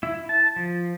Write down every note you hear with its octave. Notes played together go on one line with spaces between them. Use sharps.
E4
A5
F3